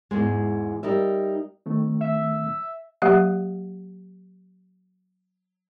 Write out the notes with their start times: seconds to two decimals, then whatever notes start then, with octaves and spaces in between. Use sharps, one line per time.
0.11 E2 G#2 G#3
0.83 G3 D#4 A#4 E5
1.66 D#3 A3 C4
2.01 E5
3.02 F#3 A#3 G4 E5 F#5